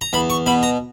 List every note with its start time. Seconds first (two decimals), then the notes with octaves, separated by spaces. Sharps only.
0.01 A#5
0.13 E2 B5
0.30 C#6
0.46 B2 B5
0.63 A#5